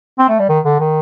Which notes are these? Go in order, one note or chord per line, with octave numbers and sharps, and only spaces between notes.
C4
A3
G3
D#3
D3
D#3